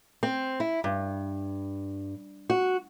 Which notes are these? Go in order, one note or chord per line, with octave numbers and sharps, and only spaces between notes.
C4
E4
G2
F#4